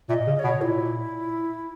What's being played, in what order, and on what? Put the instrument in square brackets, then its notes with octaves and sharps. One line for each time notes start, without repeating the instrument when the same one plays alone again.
[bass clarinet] A#2 [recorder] E5
[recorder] D#5
[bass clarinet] C#3
[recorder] D#5
[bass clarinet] B2 [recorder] C#5
[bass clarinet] A#2 [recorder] E4